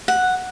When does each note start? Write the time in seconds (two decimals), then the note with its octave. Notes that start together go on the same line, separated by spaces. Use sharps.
0.08 F#5